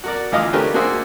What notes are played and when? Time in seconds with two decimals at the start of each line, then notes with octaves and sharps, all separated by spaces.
0.04 F#4 A#4 D5
0.32 D2 E3 F4 D#5 F5 D6
0.53 A3 C#4 D4 G4 A#4 B4
0.74 A#3 D4 F#4 G#4 C5 E5